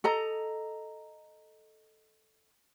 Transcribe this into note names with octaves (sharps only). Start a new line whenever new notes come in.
A4 D#5 A#5